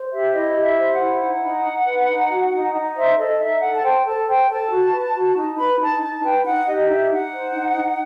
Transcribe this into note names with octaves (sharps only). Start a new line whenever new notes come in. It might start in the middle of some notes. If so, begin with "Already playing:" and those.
Already playing: C5
G4 E5
E4 D#5
G4
E5
C5
F#5
E4
D#4 F#5
D#4
D#4
B4
D#4
F#4
D#4
D#4
C5 E5
A4 D#5
D#4 E5
A4 F#5
A5
C5 G5
A4 A5
C5 G5
A4 A5
F#4
B4
F#4
D#4
B4 B5
D#4 A5
D#4 A5
B4 G5
D#4 F#5
G4 D#5
D#4 E5
D#4 F#5
C5
D#4
D#4